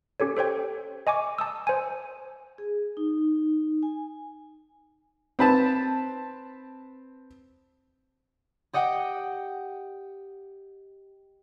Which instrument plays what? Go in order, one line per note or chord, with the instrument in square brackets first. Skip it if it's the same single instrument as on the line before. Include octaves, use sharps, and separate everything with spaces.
[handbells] C#4 G4 A4 C#5
A4 C5 C#5 G5
D#5 G#5 C#6 D6
A5 D#6 E6
C5 G#5
[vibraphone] G#4
D#4
G#5
[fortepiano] C4 B4 A5
[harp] G4 D#5 F#5 G5